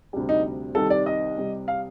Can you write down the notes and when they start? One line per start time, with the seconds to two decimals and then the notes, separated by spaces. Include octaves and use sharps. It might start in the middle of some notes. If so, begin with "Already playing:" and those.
0.13 D2 C3 G3
0.29 D#4
0.75 C2 C3 D#3 A4
0.90 D5
1.06 D#5
1.37 C2 C3 G3
1.68 F5